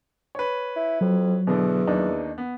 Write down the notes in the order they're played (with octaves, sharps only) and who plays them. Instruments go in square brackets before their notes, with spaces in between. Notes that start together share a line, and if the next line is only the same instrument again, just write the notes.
[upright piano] B4 C#5
[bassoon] E4
[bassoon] F2 [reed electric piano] F#3
[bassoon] E2 [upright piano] B2 D3
[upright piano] D#2 D4 D#4
B3